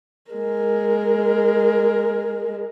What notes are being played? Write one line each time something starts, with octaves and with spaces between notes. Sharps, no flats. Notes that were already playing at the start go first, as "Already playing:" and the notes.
G#3 A#4